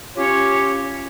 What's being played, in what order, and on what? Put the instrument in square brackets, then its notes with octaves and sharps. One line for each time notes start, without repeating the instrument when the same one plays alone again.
[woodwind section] C#4 F4 G4 C#5